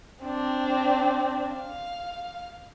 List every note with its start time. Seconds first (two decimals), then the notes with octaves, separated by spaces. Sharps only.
0.23 C4 D4
1.55 F5